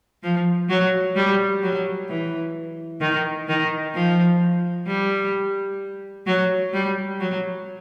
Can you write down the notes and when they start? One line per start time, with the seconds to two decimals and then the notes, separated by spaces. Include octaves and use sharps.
0.23 F3
0.69 F#3
1.15 G3
1.62 F#3
2.09 E3
3.01 D#3
3.48 D#3
3.94 F3
4.87 G3
6.26 F#3
6.73 G3
7.20 F#3